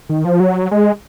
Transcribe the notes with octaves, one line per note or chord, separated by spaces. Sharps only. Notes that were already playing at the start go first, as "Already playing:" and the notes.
D#3
F3
F#3
G#3